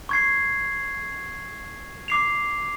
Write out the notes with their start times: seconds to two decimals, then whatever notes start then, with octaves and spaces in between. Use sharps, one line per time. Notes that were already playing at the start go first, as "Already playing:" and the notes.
0.09 C#6 G#6 C7
2.08 D6 C7 F7